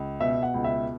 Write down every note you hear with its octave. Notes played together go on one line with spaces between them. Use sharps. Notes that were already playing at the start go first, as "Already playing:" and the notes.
Already playing: C#2
B2 E5
F#5
C#2
E5